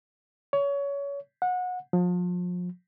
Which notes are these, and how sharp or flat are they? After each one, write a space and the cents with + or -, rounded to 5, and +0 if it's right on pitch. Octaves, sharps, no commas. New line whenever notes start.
C#5 +25
F#5 -25
F3 +35